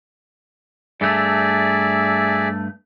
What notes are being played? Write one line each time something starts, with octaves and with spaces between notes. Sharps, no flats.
G2 A3 G#4 D5 E5